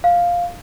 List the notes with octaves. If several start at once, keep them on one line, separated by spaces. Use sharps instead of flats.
F5